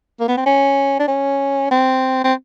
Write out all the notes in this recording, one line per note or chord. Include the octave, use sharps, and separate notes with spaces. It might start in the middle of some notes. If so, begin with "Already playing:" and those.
A#3
B3
C4
C#4
D4
C#4
C4
C4